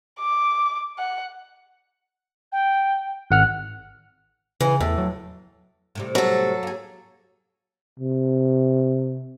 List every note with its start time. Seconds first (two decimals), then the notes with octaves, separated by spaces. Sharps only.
0.20 D6
0.99 F#5
2.52 G5
3.31 G#1 F#5 F6 F#6
4.61 C#3 E3
4.81 E2 A2
4.98 F#3
5.95 A2 C3 G3
6.15 F#3 A4
6.63 A#3 G#4
7.99 C3